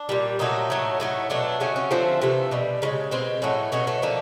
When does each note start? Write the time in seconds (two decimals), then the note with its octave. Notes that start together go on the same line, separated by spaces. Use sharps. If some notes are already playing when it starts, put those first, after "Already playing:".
Already playing: D4
0.09 A#2 G3
0.39 A#2 F#3 A3 D#4
0.70 A2 F#3 A3
1.00 A2 F#3 A3
1.30 B2 F#3 A3 D4
1.60 C#3 F#3 A3 C#4
1.76 C#4
1.91 D3 F3 A3 C4
2.21 C3 E3 A3
2.51 B2 G3
2.82 C#3 F3 G#3
3.11 B2 G#3 C4
3.42 A2 F#3 A3 C#4
3.72 B2 F#3 A3 C#4
3.87 A3
4.02 D3 F3 A3 A#3